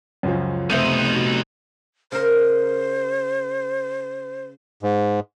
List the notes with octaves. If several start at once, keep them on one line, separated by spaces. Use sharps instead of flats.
C#2 F#2 F3 C#4
C3 A3 B3 D#4 C5 E5 G6
F#4
C#3 A#4 C5
G#2